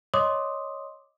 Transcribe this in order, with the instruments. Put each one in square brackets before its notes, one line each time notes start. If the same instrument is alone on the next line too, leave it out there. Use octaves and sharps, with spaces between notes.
[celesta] C#5 D#5 C6 D6 D#6